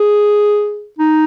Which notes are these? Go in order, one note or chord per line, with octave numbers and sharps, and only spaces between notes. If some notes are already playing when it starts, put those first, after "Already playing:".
Already playing: G#4
D#4